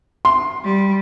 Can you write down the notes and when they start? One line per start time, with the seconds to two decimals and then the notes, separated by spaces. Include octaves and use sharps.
0.25 C6
0.64 G3